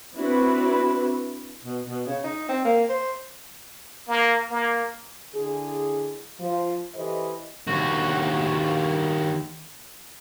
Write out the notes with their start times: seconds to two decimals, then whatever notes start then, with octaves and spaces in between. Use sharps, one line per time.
0.14 C4 D4 E4 F#4 B4
1.64 B2
1.89 B2
2.07 C#3
2.24 D#4
2.49 C4
2.65 A#3
2.89 C5
4.08 A#3
4.50 A#3
5.34 D3 E4 G#4
6.38 F3
6.95 E3 G4 A4 C5 D#5
7.68 D#2 F#4